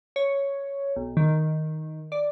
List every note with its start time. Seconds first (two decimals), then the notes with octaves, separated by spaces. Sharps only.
0.16 C#5
0.96 B1
1.17 D#3
2.12 D5